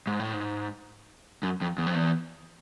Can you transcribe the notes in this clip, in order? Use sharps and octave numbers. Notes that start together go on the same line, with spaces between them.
G#2
A2
G#2
F#2
F2
E2
F2
E2